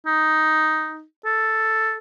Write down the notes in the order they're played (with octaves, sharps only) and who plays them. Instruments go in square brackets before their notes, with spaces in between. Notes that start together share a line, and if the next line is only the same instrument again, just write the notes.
[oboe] D#4
A4